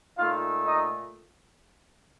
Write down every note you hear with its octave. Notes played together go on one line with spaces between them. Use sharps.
A#2 A3 D#4 F4 F5
D#4 D#5